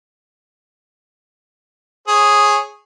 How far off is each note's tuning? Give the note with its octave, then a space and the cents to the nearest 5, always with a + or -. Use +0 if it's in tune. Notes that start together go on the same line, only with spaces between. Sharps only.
G#4 +0 C#5 -25